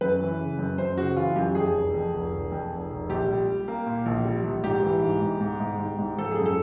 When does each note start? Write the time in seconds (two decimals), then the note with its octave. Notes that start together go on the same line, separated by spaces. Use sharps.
0.01 F#2 B4
0.20 E3
0.40 C#3
0.59 F#2
0.78 F#2 C5
0.97 C#3 F#4
1.16 E3 F4
1.36 F#2 G4
1.55 F2 G#4
1.74 F1
1.94 F2
2.13 F1
2.33 F1
2.52 F2
2.71 F1
2.90 F1
3.09 A#1 G4
3.29 G3
3.48 G3
3.68 A#3
3.86 A#2
4.06 A#1
4.25 G3
4.44 A#1
4.64 G#2 G4
4.83 E3
5.03 G#2
5.22 G#2
5.41 G#2
5.60 G#2
5.79 G#2
5.99 G#2
6.18 F3 A4
6.31 G#4
6.37 F#2
6.46 A4